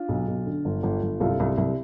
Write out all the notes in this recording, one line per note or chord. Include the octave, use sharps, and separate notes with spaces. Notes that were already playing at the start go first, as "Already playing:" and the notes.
Already playing: D4 F4
B1
B1
D3
G1
G1
G1
C2 F4 A4
C2
C2